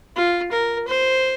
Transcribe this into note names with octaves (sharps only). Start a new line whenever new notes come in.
F4
A#4
C5